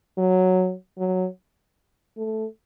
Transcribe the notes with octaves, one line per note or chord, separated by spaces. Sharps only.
F#3
F#3
A3